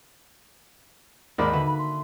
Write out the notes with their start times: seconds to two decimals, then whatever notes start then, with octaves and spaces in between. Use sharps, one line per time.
1.38 D#2 G#2 A#4 D5 B5
1.53 D3 F#4 B4 E5
1.66 B5
1.78 C6